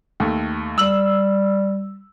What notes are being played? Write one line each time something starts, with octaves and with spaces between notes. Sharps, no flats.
D#2 A3
G3 E6 F#7